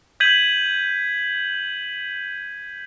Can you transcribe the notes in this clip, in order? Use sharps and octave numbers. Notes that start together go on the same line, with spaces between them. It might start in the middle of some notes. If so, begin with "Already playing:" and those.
G6 G#6 B6 D#7 F#7